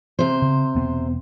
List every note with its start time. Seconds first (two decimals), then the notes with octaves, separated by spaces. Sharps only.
0.19 C3 C5
0.42 C#3
0.75 E1 B3 C4